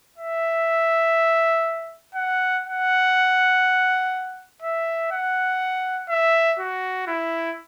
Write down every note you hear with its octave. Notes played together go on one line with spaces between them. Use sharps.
E5
F#5
F#5
E5
F#5
E5
F#4
E4